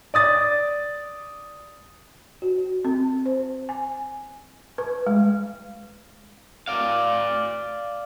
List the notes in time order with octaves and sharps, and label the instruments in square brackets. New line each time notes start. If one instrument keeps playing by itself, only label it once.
[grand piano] D5 D#6 A6
[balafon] F#4
C4
C5
G#5
B4
G#3
[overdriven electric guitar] D5 F5